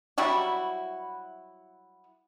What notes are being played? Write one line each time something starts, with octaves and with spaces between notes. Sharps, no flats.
F#3 G3 E4 F#4